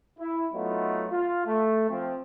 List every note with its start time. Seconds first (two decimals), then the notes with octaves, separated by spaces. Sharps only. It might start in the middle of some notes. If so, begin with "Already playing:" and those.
0.18 E4
0.53 F#3 A3 B3 D#4 F4
1.10 F4
1.45 A3
1.89 F3 C4